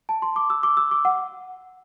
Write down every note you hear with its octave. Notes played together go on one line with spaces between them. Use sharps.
A5
C6
D6
E6
D6
E6
D6
F#5